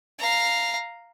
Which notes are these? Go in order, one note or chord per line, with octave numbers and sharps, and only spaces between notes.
F5 A#5